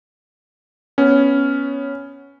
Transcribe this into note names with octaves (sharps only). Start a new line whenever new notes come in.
B3 C#4